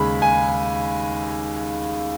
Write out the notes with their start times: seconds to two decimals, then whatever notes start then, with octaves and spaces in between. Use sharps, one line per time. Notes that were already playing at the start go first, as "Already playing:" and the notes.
Already playing: D#2 C#3 G#3 B5
0.22 G#5